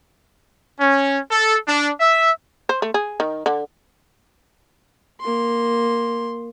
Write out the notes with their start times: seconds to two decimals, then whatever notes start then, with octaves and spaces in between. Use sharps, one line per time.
0.80 C#4
1.31 A4
1.68 D4
2.00 E5
2.69 C5
2.82 A3
2.94 G#4
3.20 D#3
3.46 D3
5.21 A#3 C6